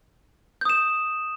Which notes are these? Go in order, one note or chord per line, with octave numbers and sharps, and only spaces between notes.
D#6 G6 E7